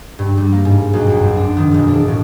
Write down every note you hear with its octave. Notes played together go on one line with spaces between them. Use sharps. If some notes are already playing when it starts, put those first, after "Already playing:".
G2
G3
A#3
G#2
B1
F#2
C4
D4
D#3
E1
D4
A2